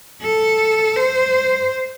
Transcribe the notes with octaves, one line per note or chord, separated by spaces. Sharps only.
A4
C5